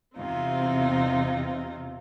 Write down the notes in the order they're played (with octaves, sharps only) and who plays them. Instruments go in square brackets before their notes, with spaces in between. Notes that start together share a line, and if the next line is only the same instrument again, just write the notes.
[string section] E2 C3 [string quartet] C4 D#4 F4